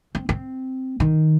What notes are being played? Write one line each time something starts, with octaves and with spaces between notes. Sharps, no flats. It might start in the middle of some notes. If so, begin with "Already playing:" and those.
C4
C4
D#3